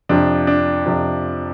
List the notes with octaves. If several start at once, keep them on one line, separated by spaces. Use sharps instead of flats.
F2 C3 F3 D4
D4
F2 C3 F3